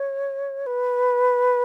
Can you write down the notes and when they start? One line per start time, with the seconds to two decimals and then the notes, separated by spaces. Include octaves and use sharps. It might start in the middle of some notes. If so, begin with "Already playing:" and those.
Already playing: C#5
0.66 B4